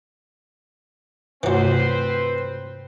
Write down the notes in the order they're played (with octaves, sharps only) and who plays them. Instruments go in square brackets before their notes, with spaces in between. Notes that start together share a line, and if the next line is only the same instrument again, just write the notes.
[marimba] G2 C3 A3 [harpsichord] E3 F#3 [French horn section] C4 B4 C5